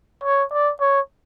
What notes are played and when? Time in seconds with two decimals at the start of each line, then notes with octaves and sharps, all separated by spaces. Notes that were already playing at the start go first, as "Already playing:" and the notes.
0.24 C#5
0.52 D5
0.81 C#5